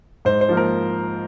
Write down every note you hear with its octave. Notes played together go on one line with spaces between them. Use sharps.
G#2 C5
C5
F3 A#3
A#4